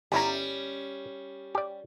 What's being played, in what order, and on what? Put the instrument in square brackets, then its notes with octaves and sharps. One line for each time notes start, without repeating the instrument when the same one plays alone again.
[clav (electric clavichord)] G1 E4 A#5 [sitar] G3 C#4
[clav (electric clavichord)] G4 D5